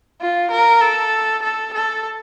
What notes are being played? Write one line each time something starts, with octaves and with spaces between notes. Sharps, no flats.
F4
A#4
A4
A4
A4